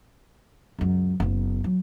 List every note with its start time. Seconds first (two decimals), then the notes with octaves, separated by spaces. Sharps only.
0.79 C#2 F#2
1.20 F#1 B3
1.64 F#3